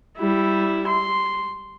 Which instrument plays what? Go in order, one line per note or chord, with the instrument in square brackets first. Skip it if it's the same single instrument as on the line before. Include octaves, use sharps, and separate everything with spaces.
[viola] G3 E4
C6